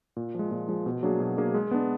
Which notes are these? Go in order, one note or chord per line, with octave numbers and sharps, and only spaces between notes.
A#2
F3 G#3
A#2
F3 G#3
B2
F#3 A#3 D4 G#4
B2
F#3 A#3 D4 G#4
G#3
B3 D4